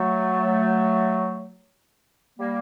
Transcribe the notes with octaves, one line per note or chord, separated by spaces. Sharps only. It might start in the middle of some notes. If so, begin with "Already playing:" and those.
Already playing: F#3 A3
G3 A#3